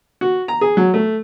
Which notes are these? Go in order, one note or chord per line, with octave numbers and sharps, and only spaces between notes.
F#4
A#5
G#4
F#3
A3